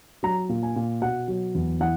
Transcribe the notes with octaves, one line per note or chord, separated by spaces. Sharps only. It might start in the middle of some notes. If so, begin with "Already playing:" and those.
F#3 A#5
A#2
G#5
A#2
B2 F#5
F#3
E2
E3 F#5